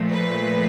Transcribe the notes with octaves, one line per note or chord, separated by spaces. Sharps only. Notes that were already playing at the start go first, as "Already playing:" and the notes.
Already playing: A#2 F3 A3
B4